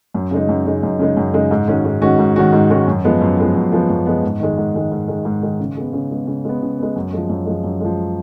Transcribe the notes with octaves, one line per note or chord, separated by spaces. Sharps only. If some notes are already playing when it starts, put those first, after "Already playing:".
F#2
C#3 G#3 D#4
F#2
C#3 G#3 D#4
F#2
C#3 G#3 D#4
F#2
C#3 G#3 D#4
G#2
D#3 G#3 C#4 F#4
G#2
D#3 G#3 C#4 F#4
G#2
D#3 G#3 C#4 F#4
G#2
D#3 G#3 C#4 F#4
F#2
F3 G#3 B3
F#2
F3 G#3 B3
F#2
F3 G#3 B3
F#2
F3 G#3 B3
G#2
D#3 G#3
G#2
D#3 G#3
G#2
D#3 G#3
G#2
D#3 G#3
C#3
G#3 B3
C#3
G#3 B3
C#3
G#3 B3
C#3
G#3 B3
F#2
F3 G#3
F#2
F3 G#3
F#2
F3 G#3